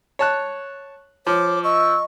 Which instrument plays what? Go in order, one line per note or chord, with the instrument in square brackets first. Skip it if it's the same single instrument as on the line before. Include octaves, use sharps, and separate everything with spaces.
[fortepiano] C#5 A5 F#6
[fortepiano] F3 [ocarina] C#5 [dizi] D6
[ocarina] D#5 [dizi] C#6 [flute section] E6